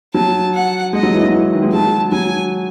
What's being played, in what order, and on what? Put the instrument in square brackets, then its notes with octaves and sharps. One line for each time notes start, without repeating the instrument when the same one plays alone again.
[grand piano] F#3 [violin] A5
[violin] F#5
[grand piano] G#3 [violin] D#5
[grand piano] F#3
E3
F#3
E3
D#3
G#3
[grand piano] F#3 [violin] A5
[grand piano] F#3 [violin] G#5